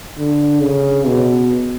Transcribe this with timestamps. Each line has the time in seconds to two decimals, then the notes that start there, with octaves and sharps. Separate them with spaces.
0.19 D3
0.62 C#3
1.06 B2